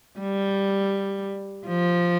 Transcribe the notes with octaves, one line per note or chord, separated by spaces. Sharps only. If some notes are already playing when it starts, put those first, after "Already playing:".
G3
F3